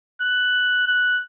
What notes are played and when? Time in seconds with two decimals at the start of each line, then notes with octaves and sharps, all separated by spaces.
0.22 F#6
0.87 F#6